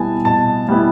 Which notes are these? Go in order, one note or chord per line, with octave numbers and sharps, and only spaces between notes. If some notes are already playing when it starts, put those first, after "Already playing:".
Already playing: B2 G3 B3 E4 G#5 A5
B2 A5
G3 B3 E4